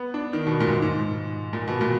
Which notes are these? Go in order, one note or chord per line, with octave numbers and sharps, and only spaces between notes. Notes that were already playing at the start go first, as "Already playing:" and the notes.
Already playing: B3
D4
D#3
B2
A#2
G#2
G#2
A#2
B2
A#2